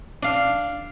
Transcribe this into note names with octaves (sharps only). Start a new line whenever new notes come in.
D4 F5